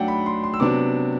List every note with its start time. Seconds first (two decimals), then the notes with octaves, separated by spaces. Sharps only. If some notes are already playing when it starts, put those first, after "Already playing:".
Already playing: F#3 A3 D4 F#5 G5
0.08 B5
0.26 C6
0.44 C6
0.54 E6
0.60 C3 F#3 B3 D4 D6